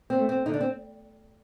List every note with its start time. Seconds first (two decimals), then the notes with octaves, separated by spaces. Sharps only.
0.10 C4
0.19 A3
0.29 C4
0.46 D3 D#4
0.54 D4
0.61 C4